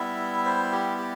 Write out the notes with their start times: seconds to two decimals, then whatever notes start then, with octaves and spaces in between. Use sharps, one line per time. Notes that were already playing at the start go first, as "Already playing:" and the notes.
Already playing: G3 B3 E4 E5
0.46 C5
0.72 G4
0.98 G4